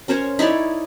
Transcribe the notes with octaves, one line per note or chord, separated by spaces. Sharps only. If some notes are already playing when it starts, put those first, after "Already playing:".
C#4 A#4 C5 C#5
D#4 E4 C#5 D5